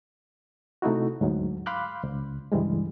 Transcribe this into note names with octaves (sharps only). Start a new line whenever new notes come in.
C3 A3 D#4 E4 F#4
D2 G#2 F#3
F5 B5 C6 D6 F#6 G6
C#2
C#2 G2 E3 G3 G#3